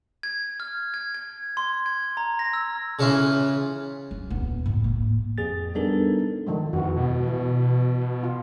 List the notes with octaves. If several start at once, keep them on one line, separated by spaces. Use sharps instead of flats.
G#6
F6
G#6
G#6
C6
G#6
A#5
A#6
E6
C#3 E3 E4 F4
F#3
D#1 B3
A2
A#3
F2 G#4 A6
G3 B3 D4 D#4 A4 A#4
D#3 F3 G#3
F2 E3 F#4
B2
E3
F4